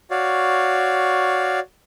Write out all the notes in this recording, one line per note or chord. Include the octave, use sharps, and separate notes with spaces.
F#4 C#5 D5 F5